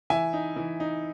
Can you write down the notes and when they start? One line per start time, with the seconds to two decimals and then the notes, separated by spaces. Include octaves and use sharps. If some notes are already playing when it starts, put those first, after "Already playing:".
0.10 E3 E5 G#5
0.33 D#4
0.56 E3
0.80 D#4